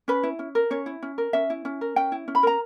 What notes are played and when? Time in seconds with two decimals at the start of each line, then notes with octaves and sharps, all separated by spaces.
0.08 C#4 B4
0.23 E4
0.39 C#4
0.55 A#4
0.70 C#4 C#5
0.86 E4
1.03 C#4
1.18 A#4
1.33 C#4 E5
1.50 E4
1.65 C#4
1.81 A#4
1.96 C#4 G5
2.12 E4
2.28 C#4
2.35 B5
2.43 A#4 A#5